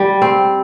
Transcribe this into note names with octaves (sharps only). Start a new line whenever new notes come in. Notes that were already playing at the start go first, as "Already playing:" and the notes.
Already playing: G3
C4